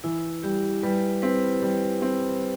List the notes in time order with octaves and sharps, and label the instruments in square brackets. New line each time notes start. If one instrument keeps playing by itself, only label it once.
[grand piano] E3 [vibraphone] E4
[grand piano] G3 [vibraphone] G4
[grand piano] G3 [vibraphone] B4
[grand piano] C4 [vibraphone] B4
[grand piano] G3
C4